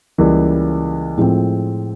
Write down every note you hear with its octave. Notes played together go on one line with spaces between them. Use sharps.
C#2 C#3 E3 G3 A#3
A2 F3 G#3 C4